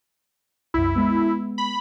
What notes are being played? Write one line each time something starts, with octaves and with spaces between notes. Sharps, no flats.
C2 F#2 E4
G#3 B3
B5